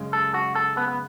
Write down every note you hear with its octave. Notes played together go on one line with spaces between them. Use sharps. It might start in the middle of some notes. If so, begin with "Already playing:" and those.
Already playing: F#2 C#3 G#3
A4
F#4
A4
B3
B3